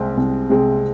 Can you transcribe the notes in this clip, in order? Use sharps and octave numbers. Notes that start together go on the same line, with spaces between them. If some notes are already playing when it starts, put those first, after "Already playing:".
Already playing: C2 C3 G#3 C4 G#4
C2
C3 G#3 C4 G#4